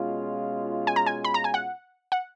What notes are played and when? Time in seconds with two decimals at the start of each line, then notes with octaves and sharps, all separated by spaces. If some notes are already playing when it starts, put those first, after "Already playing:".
Already playing: B2 G#3 C#4 F4
0.87 G#5
0.96 A#5
1.06 G#5
1.24 B5
1.34 A#5
1.44 G#5
1.54 F#5
2.12 F#5